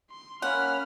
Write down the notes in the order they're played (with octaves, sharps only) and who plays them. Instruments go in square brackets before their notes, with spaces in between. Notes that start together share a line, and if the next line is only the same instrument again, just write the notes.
[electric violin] C6
[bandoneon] A#3 C#4 [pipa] F#5 [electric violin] B5 F6